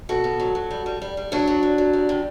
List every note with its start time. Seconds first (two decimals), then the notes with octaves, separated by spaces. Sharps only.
0.09 B2 F#4 A4
0.24 B2
0.40 F#3
0.55 F#3
0.71 G3
0.86 G3
1.02 G3
1.17 G3
1.32 F#3 D4 F#4
1.47 F#3
1.63 F#3
1.78 F#3
1.93 G3
2.09 C3